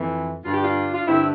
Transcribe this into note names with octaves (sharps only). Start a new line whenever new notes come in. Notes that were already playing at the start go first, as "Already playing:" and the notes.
Already playing: F2 E3
G2 D3 F4
G4
D4 F4
F4
G2 D3 C4 E4